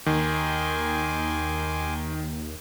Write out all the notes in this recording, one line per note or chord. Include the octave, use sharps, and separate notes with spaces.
D#2 D#3 G#5 C6 D6